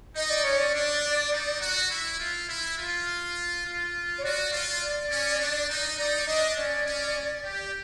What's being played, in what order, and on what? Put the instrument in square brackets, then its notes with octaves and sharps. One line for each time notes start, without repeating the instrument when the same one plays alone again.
[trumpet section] D#4 [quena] D#5
[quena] D5
[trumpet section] C#4 [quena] C#5
[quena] D5
[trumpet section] D4
D#4
F#4
E4
F4
E4
F4
F4
[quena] C#5
[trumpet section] F#4 [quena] D5
[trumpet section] F4
[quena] D5
[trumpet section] C#4
D4
D#4
[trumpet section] D#4 [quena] D5
[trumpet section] D4 [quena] D#5
[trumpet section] C#4 [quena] D5
[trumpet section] C#4
G4